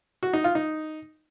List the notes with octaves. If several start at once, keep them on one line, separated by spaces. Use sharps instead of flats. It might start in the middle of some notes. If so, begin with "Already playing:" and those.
F#4
D#4
F4
D#4